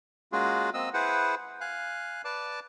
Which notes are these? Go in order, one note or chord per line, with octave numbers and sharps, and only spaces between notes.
G#3 A#3 C#4 F4 F#4 G#4
A#3 C4 D#5 E6
E4 G#4 B4 C5 F#5
F5 G#5 F#6
B4 D5 A5 D6